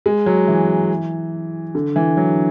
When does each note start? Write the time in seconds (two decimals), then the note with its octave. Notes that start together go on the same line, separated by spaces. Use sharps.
0.06 G#3
0.26 F#3
0.48 E3
1.75 D3
1.96 E3
2.17 F#3